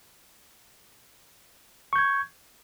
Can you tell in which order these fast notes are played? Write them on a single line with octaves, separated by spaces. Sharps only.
C#6 G6 G#6